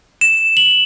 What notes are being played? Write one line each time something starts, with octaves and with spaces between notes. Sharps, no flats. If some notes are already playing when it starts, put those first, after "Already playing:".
E7
F#7